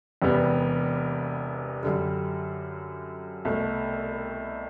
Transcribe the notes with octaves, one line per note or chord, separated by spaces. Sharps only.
E1 E2 C3 G3 B3
F#2 D3 G3
C2 B2 A3